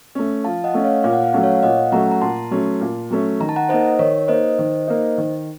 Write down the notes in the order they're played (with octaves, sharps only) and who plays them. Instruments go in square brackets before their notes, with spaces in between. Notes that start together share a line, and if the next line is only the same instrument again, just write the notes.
[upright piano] A3 C#4
[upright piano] F3 [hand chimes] F5 A5
[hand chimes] D#5 F#5
[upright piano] A3 C#4
[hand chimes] C#5 F5
[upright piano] A#2 [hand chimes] F5
[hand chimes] F#5
F5
[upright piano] F#3 A3 C#4 [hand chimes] F#5
[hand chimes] C#5 F5
F5
[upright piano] A#2 [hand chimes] D#5 F#5
[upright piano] F#3 A3 C#4 [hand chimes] F#5 A#5
[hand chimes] A#5
[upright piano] A#2 [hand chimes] A5 C6
[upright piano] F#3 A3 C#4
A#2
F#3 A3 C#4
[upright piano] D#3 [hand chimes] A#5
[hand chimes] A5
F#5 A#5
[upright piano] A#3 D#4 [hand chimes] C5 D#5
[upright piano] D#3 [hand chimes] A#4 C#5
[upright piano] A#3 D#4 [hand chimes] C5 D#5
[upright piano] D#3
A#3 D#4
D#3